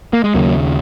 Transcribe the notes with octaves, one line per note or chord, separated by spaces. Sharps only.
A#3
G#3
D#2 C#3 F#3 A#3